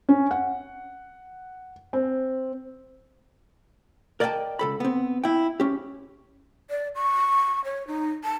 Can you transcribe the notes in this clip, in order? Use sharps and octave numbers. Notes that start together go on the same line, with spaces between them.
C#4
F#5
C4
A#4 D5 D#5 F5 G5 A5
C#2 A4 B5
B3 C4
E4 G5
C#4 G4
D5
C#6
C#5
D#4
A5